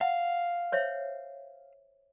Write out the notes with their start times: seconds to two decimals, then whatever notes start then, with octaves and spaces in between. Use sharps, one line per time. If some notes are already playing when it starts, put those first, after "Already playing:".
0.01 F5 F#5
0.72 C5 C#5 E5